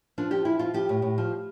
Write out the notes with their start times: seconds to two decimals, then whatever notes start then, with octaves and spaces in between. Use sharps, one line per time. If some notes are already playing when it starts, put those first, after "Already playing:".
0.18 F3 D4
0.31 F3 G4
0.45 F3 E4
0.59 F3 F4
0.74 F3 G4
0.89 A2
1.02 A2
1.18 F3